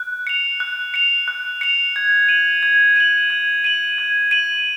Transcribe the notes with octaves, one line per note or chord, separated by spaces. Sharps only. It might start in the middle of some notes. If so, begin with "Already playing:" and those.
Already playing: F#6
C#7 F7
F#6
C#7 F7
F#6
C#7 F7
G#6
D#7 F#7
G#6
D#7 F#7
G#6
D#7 F#7
G#6
D#7 F#7